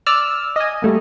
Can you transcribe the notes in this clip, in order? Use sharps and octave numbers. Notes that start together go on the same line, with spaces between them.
D5 E6 F6
D#5 G#5
G3 A3 A#3